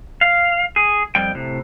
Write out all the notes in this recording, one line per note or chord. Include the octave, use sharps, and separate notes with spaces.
F5
G#4
F2 G3 G5
A2 C3